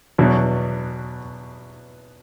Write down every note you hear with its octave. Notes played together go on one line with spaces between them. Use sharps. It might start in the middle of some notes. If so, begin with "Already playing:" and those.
E2 B2 F#3